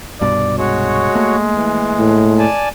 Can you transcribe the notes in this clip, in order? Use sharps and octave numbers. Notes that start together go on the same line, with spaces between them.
C2 G2 B2 D5
G#3 F#4 C#5
A3 A#3
E3
A2
D5 G#5 A5